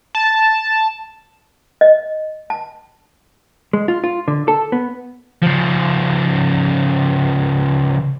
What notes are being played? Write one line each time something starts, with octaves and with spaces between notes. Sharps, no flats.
A5
D#5
A5
G#3
F4
F4
D3
A4
B3
C#3 F3